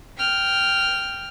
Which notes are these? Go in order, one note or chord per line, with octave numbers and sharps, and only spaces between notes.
G5 F6